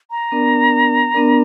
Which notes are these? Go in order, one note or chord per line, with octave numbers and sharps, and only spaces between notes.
A#5
B3 D4 A#4 D5
B3 D4 A#4 D5